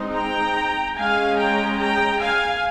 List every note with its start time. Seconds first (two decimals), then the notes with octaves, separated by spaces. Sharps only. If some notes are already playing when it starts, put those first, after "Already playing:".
Already playing: G#3 C4 D#4
0.14 G5 A#5
0.97 G#3 C#4 F5 G#5
1.38 G5 A#5
1.79 G5 A#5
2.21 F5 G#5